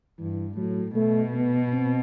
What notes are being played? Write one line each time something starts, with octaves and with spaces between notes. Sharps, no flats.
G2 E3
A2 F#3
B2 A3
B3
C4